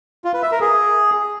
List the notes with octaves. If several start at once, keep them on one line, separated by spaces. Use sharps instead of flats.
F4
B4
E5
A#4
G#4